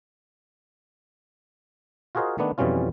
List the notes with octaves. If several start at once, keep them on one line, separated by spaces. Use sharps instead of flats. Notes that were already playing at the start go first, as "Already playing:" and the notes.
F4 F#4 G#4 A#4 C5 D#5
D#3 A3 B3 D4
F2 B2 E3 G3 C#4 F4